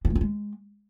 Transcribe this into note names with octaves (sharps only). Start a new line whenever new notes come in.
D4
A3
C#4
G#3